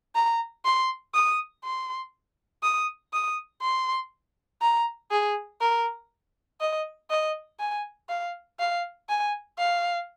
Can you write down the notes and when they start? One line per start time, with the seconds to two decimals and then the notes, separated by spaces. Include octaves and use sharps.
0.15 A#5
0.65 C6
1.14 D#6
1.64 C6
2.63 D#6
3.13 D#6
3.63 C6
4.62 A#5
5.11 G#4
5.61 A#4
6.61 D#5
7.10 D#5
7.60 G#5
8.09 F5
8.60 F5
9.09 G#5
9.58 F5